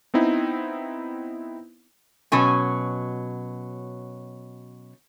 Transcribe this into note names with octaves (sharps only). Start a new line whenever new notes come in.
B3 C4 D#4 E4
B2 F#3 C#4 G#5